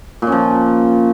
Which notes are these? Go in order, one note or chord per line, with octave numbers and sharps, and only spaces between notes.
A#2 F3 C#4